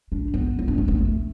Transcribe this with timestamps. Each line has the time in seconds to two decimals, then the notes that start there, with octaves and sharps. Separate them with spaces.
0.12 D4
0.34 B3
0.59 E4
0.68 D4
0.78 C#4
0.88 B3
0.98 A3